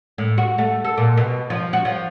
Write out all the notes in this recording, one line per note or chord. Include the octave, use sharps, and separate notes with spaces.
A2
F#4
A3
A4
A#2
B2
F3
F#4
F3